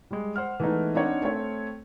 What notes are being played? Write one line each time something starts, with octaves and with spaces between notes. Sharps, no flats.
G3 G#3
C5 F#5 F6
E3 G#3 A3 B3 D#4
C4 D4 D#4 C#5 F#5
A3 C4 C#5